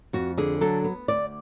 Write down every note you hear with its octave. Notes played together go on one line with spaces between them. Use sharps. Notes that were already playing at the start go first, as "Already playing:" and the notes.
F2 F#4
D3 G#4
F#3 A4
B3
D2 D5